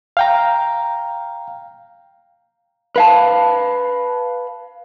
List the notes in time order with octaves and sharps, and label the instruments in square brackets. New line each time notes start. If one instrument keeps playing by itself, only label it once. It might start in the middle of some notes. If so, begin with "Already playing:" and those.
[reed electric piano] F5 G5 A#5
[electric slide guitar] B4 F5 A5